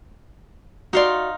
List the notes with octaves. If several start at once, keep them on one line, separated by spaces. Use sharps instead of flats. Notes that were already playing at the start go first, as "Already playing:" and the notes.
D#4 F#4 D5 F5 C6